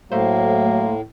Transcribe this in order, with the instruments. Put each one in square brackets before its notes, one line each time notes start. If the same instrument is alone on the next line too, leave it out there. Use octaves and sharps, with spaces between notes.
[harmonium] A2 [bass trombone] F#3 [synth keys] A3 C5 [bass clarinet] A#3